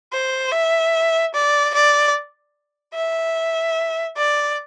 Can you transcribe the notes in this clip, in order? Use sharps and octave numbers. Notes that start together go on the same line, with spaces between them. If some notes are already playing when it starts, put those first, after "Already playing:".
C5
E5
D5
D5
E5
D5